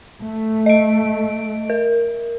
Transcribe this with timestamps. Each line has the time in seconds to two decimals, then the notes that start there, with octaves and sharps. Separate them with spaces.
0.22 A3
0.66 D#5 D7
1.70 A#4